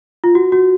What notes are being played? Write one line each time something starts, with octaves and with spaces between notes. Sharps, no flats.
F4
F#4
F#4